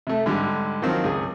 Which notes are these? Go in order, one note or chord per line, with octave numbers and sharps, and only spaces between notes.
C3 A3
G#2 D3 G3
D#3 F3 F#3 C4
C#2 G#4